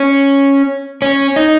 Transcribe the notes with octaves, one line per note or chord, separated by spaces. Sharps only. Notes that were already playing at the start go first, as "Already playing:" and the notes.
Already playing: C#4
C#4
D#4